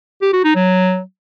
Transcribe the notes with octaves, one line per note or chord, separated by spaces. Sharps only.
G4
F#4
D#4
F#3